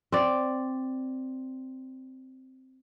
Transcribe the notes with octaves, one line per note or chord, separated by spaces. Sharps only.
C4 D5